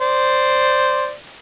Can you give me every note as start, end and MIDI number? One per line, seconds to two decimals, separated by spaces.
0.01 1.13 72
0.01 1.13 74